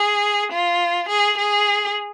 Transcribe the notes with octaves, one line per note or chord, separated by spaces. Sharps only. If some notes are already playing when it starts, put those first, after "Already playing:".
Already playing: G#4
F4
G#4
G#4